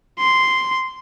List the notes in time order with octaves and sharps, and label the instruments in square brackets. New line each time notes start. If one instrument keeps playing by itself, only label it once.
[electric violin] C6